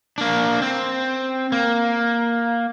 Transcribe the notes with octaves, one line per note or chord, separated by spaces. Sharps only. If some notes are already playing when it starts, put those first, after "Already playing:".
A#3 D4
C4
A#3